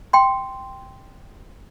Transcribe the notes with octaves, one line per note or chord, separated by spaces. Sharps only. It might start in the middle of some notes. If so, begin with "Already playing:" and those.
G5 C6